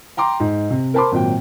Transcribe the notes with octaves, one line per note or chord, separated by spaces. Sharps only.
G5 A#5 C6 D6
G#2
C3
A#4 C5 A5 B5 C6 D6
G#1 A#2 F#3 G5